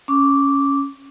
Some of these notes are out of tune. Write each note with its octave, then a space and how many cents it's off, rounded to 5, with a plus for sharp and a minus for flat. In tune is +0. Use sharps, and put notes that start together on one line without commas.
C#4 +0 D6 -10